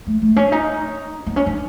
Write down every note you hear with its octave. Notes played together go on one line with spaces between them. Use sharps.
A3
A3
C#4
D#4
B3
C#4
C#4